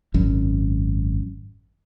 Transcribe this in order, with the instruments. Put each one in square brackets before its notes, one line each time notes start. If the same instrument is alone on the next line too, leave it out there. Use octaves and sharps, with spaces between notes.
[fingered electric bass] G#1 F#2